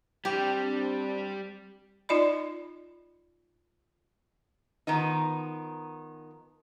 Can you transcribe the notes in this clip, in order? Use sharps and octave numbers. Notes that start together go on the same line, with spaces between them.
G3 C4 D4 G4
D#4 F4 D5 D#5 B5
D#3 F3 B3 D#4